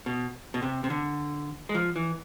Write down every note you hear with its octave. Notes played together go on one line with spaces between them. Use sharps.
B2
B2
C3
C3
D3
G#3
F3
E3